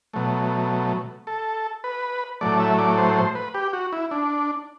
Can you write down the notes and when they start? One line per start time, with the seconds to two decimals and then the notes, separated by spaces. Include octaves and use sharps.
0.14 B2 F#3 A3
1.27 A4
1.84 B4
2.41 A2 F#3 A3 D5
2.60 E5
2.79 D5
2.98 C5
3.16 C5
3.35 B4
3.54 G4
3.73 F#4
3.93 E4
4.11 D4